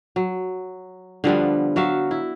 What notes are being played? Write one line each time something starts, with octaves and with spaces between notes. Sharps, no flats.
F#3
D3 F3 G3 B3
F#3 F#4 E5 F5
E4